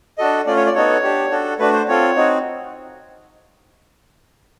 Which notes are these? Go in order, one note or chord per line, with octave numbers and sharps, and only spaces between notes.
D4 F#4 A4 D#5
A3 C#4 F4 D5
C#5
D5
B3 D#4 F#4 A4 C#5
D4 G4
D4 F#4 A4
A3 D4 F#4 B4
C5
C4 F4 A4 C#5
C4 D#4 F#4